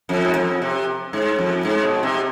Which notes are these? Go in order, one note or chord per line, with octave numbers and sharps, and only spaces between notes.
F2
G#2
F2
C3
G#2
F2
G#2
B2
C3